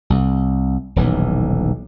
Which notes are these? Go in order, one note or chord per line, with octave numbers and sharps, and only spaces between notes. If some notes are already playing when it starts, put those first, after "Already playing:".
C2
D#1 B1 E3